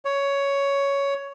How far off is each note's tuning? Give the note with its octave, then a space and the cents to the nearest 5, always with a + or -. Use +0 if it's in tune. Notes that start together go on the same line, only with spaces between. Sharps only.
C#5 +10